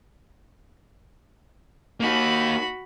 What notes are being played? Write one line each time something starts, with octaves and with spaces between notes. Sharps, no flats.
A#3 D#4 F#4 B5